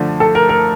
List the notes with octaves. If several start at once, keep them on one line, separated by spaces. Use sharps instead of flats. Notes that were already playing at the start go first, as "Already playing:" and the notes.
Already playing: D3 F3 A3 D4
A4
A#4
A#4